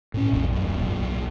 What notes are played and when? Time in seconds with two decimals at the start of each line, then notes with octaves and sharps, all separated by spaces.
0.14 A2 C#4
0.33 A#1 E2 A#2
0.52 D1 F#2
0.81 B1 A#2